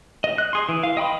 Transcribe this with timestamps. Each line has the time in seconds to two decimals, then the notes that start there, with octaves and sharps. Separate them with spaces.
0.24 D#5
0.38 F#6
0.53 G#4 C6
0.69 E3
0.83 F5
0.97 D#5 G5 B5 C6